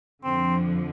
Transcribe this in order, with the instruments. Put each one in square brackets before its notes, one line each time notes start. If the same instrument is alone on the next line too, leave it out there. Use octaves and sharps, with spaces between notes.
[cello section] F2 D3 F3 [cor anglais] C4